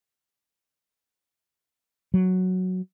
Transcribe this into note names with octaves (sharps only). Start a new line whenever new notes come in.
F#3